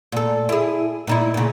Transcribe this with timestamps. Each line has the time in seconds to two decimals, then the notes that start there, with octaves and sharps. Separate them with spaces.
0.12 A#2 A4
0.49 E4 G#4
1.07 A#2 D#4 E4
1.34 A#2 C#3